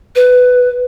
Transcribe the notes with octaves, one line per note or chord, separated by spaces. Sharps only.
B4